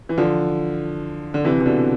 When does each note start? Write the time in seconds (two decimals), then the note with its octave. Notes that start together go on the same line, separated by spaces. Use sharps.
0.09 E3
0.18 D3 F3
1.34 D3
1.45 C3 E3
1.61 E3
1.65 B2 D3